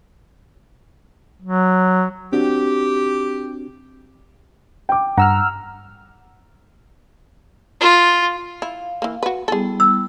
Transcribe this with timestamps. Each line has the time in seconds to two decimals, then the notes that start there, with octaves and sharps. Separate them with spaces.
1.42 F#3
2.33 C4 D4 F#4 G4
4.89 G5 D6
5.17 G2 F#5 A#5 E6 F6
7.80 F4
8.62 E4 F5
9.02 E3 A#3
9.23 F#4 B4
9.48 G3 B3 E4 G#4 A4
9.80 E6